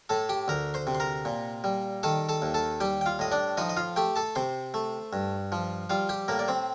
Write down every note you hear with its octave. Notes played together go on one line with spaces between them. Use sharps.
A2 A4 A5
G4 G5
D2 A#4 A#5
C5 C6
C3
C6
A#4 A#5
A#2
G3
D#3 A4 A5
A4 A5
D#2
A4 A5
G3 G4 G5
G5
F4 F5
A2 D#5
D4 D5
F3 D#4 D#5
D#5
F4 F5
A3 G4 G5
A4 A5
C3 C5 C6
A3
G2
F3
G3 F4 F5
G4 G5
A2 A#3 A#4
D5
C4 C5